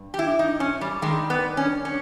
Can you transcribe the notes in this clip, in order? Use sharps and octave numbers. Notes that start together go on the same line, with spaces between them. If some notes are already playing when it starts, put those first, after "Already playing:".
Already playing: G2
G4
E4
D#4
C#4
G3
G2 D#3 G3 G#3
B3
C#4
C#4